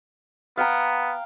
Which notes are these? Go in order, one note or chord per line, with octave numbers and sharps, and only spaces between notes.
B3 F5 G5 A#5